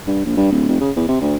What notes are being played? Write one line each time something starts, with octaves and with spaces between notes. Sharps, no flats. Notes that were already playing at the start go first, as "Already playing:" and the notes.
G2
A#1
G2
D1
F1
C#3
E2
C3
D2